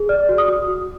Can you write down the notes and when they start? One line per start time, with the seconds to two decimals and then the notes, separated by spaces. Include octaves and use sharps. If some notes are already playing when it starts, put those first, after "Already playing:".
Already playing: G#4
0.09 D5 F6
0.29 F#4
0.38 D#6
0.48 F#4
0.68 F#4